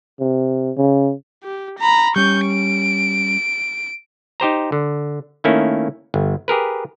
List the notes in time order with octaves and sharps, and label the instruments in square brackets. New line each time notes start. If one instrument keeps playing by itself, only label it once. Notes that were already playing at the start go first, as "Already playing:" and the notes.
[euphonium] C3
C#3
[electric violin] G4
A#5 B5
[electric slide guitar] G3 C#4 [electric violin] C#6 G6
[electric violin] D7
[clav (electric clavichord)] D#4 G4 C5 A#5
D3
D#3 A3 A#3 C#4 E4
G1
G4 G#4 A#4 B4